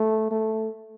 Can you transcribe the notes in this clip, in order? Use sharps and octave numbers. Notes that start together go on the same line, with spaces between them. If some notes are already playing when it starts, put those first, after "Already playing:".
Already playing: A3
A3